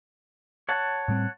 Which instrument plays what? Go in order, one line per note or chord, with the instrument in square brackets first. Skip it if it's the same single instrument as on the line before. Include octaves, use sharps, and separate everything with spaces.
[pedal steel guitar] C#5 F#5 A5
[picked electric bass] A2 G3 C4